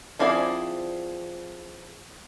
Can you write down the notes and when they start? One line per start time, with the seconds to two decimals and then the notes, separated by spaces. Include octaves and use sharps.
0.19 F3 C4 E4 G#4 D5